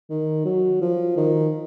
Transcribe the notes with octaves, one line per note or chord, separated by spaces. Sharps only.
D#3
F#3
F3
D#3